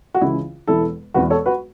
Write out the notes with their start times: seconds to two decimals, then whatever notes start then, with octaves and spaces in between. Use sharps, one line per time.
0.14 F#4
0.21 C#2 C#3 E3 E4
0.68 E1 E2 E3 E4 A4
1.14 E1 E2 E3 F#4 B4
1.30 A4 C#5
1.46 F#4 B4